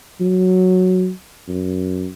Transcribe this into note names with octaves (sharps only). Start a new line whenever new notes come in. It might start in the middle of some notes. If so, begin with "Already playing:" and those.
F#3
F#2